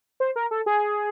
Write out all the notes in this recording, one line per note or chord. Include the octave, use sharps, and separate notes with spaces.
C5
A#4
A4
G#4